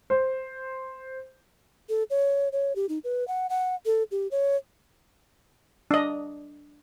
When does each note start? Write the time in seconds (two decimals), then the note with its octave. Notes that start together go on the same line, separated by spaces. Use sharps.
0.10 C5
1.89 A4
2.10 C#5
2.52 C#5
2.76 G4
2.89 D#4
3.04 B4
3.28 F#5
3.50 F#5
3.86 A4
4.11 G4
4.31 C#5
5.91 D4 D#5